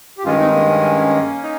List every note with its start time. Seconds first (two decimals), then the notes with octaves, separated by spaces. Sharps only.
0.18 G4
0.24 G2 D#3 G#3 C#4 F4
0.39 C4 D#4
0.53 A#3 C#4
0.69 A#3 C#4
1.43 D#4